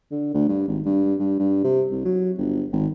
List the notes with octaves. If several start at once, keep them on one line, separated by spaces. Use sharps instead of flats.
D3
D2
G2
G#1
G2
G2
G2
C3
C2
F#3
G1
G#1